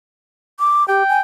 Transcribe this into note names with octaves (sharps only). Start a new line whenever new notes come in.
D6
G4 G5
G#5